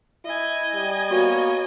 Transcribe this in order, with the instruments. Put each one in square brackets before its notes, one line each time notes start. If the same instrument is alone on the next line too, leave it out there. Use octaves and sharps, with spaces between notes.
[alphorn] E4 [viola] D#5 G#5
[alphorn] G3
[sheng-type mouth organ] A#3 B3 C#5 [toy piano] F#4